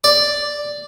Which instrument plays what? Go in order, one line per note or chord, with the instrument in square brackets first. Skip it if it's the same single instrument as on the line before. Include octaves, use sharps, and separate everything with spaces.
[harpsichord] D5